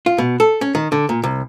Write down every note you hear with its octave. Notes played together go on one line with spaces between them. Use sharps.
F4
B2
A4
C#4
D#3
D3
A#2
C2